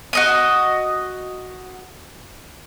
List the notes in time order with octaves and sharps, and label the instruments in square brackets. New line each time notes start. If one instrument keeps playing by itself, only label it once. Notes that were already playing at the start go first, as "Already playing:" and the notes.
[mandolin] F#4 D#5 D#6